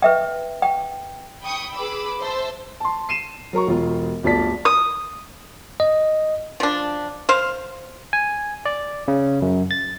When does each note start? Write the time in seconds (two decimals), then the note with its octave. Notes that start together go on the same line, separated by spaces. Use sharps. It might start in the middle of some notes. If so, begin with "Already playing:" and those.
0.02 B4 E5 G5
0.62 G5
1.43 G5 B5 C#6 D#6
1.76 G#4 B4 B5 D6 E6
2.21 C5 E5 A5 E6
2.80 A5 C6
3.09 C7 D#7 E7
3.53 F#3 A#4 A#5 C#6
3.67 E1 F4
4.23 D1 G1 F4 D5 A5 B6
4.65 D#6
5.80 D#5
6.60 F3 D4
7.29 C5 F5
8.13 G#5
8.66 D5
9.08 C#3
9.42 F#2
9.71 A6